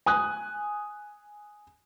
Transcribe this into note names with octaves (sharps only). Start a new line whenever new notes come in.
G#5 D#6 F#6